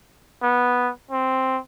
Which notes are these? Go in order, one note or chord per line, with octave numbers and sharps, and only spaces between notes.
B3
C4